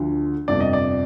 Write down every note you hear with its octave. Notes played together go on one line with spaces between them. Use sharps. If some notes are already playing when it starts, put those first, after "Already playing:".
Already playing: D2 D3 F3
G1 F2 C3 D5
D#5
D5